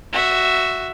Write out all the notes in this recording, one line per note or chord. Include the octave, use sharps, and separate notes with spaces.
F#4 E5